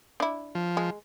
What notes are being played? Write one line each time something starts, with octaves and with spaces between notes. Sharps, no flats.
D4 E4
F3
G#3